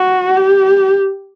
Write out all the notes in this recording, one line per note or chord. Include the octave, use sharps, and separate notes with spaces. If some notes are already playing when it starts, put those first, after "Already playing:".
Already playing: F#4
G4